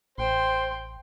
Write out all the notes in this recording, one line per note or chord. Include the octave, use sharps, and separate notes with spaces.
A1 C5 G5 C6